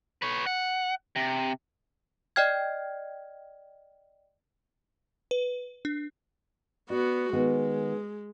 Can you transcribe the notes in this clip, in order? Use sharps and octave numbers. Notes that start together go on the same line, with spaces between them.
B4 C#5
F#5
C3
D5 D#5 G5 F6 G#6
B4
D4
B3 F#4 D5
D#3 G#3 B3 G#5